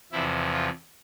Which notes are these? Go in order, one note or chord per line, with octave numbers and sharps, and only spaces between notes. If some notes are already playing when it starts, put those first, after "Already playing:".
E2 C3 F3 E4
F4